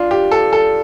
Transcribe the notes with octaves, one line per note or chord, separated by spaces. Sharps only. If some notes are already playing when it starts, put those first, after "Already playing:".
Already playing: D4 F4
G4
A4
A4